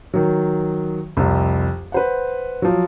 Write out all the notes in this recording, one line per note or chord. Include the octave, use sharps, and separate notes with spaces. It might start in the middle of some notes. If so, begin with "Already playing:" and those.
D#3 F#3
C2 F2
B4 C5 F#5
F3 F#3